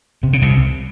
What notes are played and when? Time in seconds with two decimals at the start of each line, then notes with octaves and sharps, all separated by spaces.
0.23 C3
0.33 C#3
0.42 C2 C3